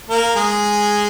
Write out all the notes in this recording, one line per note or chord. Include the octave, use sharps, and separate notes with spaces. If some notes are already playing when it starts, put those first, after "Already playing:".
A#3 A#4
G#3 G#4